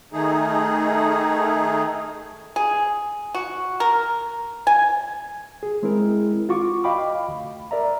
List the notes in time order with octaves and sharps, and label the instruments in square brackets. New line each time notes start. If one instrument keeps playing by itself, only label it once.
[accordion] D#3 A3 D#4 G#4
[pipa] G#4
F#4
A#4
G#5
[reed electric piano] G#4
G#3 C4 E4 G#4 A#4
F4 F#4 C#6 D6
D#5 F5 G5 B5 D6
D2
A#4 D5 E5 A#5